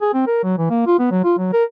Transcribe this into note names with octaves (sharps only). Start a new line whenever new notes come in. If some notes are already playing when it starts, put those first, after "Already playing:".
G#4
C4
A#4
F#3
E3
A#3
F4
B3
F#3
F4
F#3
A#4